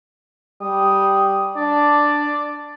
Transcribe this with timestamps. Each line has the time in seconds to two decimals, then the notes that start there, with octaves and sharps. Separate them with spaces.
0.62 G3 D#6
1.57 D4 D5